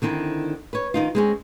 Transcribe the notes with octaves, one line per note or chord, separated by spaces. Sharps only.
D3 D#3 C4 E4
B4 C#5
D#3 D#4 F4
G#3 C4 C#4